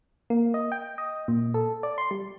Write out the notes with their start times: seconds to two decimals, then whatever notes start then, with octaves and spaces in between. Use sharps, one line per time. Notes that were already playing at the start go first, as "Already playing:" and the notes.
0.30 A#3
0.54 D#5
0.72 G5
0.98 D#5
1.28 A#2
1.54 A4
1.83 D5
1.98 C6
2.11 G3